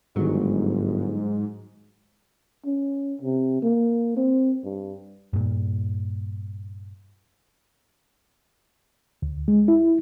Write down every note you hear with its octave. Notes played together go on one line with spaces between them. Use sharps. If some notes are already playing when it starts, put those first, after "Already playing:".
G1 G#2 D#3 F#3
C#4
C3
A#3
C4
G2
G2 A#2
D2
G#3
E4